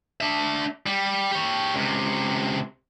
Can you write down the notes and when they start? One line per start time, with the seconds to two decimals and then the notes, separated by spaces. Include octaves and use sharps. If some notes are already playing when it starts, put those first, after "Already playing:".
0.21 D4 E5
0.86 G3
1.31 G4 C#5
1.74 C#2 C3